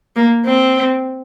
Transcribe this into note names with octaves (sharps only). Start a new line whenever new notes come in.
A#3
C4